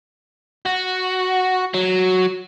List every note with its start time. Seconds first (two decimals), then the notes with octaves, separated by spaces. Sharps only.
0.66 F#4
1.74 F#3